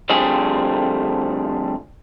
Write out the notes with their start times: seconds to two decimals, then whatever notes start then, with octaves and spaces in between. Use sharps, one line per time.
0.09 D3 F3 G3 A3 C4 G#4